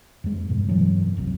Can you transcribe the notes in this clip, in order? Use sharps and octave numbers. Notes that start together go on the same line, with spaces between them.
F2 G#3
G2 B2
G2 C3 E3 F#3
F1 C2 F#2